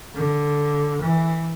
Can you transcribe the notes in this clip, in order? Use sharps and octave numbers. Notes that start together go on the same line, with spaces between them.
D3
E3